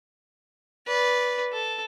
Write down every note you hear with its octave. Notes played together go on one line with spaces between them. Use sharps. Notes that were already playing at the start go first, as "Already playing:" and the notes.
B4 D5
A4